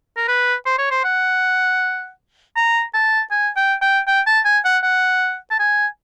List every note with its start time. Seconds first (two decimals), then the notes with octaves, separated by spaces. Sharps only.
0.17 A#4
0.28 B4
0.66 C5
0.78 C#5
0.90 C5
1.04 F#5
2.56 A#5
2.94 A5
3.31 G#5
3.56 G5
3.81 G5
4.07 G5
4.27 A5
4.45 G#5
4.65 F#5
4.83 F#5
5.51 A5
5.60 G#5